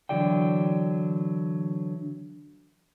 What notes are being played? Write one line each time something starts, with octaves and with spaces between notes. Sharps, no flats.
D3 E3 F#3 F#4 D5 G5